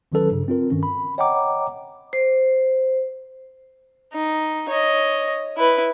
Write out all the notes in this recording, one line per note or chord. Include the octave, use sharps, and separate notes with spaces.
G1 D#3 F#3 C#4 A4 B4
G2 C#3
C4 F4 A#4
G2 D#3 C#4
B5
C#5 D#5 F#5 G5 A#5 D6
C5
D#4
C#5 D#5
E4 B4